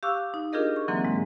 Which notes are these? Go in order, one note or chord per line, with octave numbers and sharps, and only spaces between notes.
G4 F5 C#6 D6 E6 F#6
D#4
D4 F4 G4 G#4 A#4 D#5
C#6
D3 E3 F#3 A#3 C4
G#2 G#3